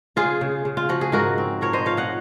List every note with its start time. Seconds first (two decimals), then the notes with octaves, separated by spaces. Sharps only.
0.16 C#3 F4 G#4
0.41 C#3
0.65 C#3
0.77 F4
0.89 F3 F#4
1.01 G#4
1.12 G#2 F#4 A#4
1.38 C4
1.61 F3 A#4 C#5
1.73 C5 D#5
1.85 F3 C#5 F5
1.97 D#5 F#5